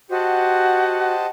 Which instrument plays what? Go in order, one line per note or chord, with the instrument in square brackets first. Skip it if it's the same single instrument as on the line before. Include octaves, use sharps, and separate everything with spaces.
[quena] F#4 [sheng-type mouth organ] G4 C5 D#5 F#5 A5